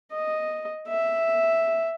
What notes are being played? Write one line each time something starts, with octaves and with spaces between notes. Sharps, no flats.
D#5
E5